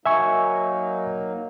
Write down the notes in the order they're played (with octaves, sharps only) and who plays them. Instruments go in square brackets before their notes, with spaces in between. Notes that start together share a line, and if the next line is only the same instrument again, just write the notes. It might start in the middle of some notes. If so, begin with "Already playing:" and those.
[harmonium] F#3 A#3 D#4 [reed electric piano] E5 G#5 C#6